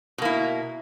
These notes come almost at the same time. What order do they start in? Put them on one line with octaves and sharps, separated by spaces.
B2 A#3 E4